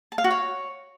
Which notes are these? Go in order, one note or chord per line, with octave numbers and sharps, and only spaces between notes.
A5
F5
F#4
C#5